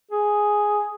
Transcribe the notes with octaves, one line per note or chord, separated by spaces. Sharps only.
G#4